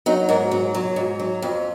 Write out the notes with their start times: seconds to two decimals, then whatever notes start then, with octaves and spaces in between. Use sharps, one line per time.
0.06 F#3 D#4
0.29 G#2 A#4
0.52 F#3
0.74 F#3
0.96 G#2
1.19 F#3
1.42 F2